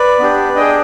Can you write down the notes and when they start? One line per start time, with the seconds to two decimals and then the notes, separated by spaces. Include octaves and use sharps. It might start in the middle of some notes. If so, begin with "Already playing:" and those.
Already playing: B4 D5
0.19 B3 D4 G4
0.56 D4 G#4 D#5 G5